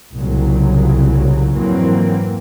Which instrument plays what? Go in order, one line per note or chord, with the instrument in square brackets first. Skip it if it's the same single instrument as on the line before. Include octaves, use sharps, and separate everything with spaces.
[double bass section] C2 A#2 C#3 F#3
F2 G#2 E3 F#3 A#3 C4